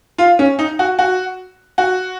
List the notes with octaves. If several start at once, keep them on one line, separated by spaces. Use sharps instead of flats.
F4
C#4
D#4
F#4
F#4
F#4